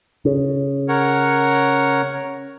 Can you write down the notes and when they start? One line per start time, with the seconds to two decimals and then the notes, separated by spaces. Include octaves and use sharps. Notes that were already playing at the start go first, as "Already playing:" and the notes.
0.25 C#3
0.89 A#4 C#5 F#5